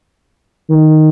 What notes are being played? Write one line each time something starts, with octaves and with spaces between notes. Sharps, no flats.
D#3